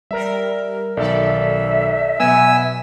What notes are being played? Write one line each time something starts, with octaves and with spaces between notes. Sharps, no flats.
G3 A#4 E5 A#5
B1 D#3 A4 D5 E5
B2 F#3 B3 G#5 E6